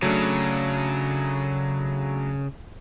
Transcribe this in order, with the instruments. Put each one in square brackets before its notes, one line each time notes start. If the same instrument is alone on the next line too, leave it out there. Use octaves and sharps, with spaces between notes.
[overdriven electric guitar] C#3 [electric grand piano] F#3 A3 D4